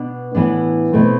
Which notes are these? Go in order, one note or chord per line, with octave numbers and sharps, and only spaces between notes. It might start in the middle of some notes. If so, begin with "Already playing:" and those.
Already playing: B2 B3 D4
A2 E3 B3 D4
B2 A3 C4